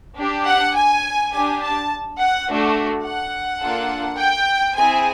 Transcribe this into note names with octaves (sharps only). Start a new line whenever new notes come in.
D4 G4
F#5
G#5
D4 G4 G#5
A5
F#5
A3 D4 F#4
F#5
A#3 D4 F4 A4
G5
C4 E4 G#4 G#5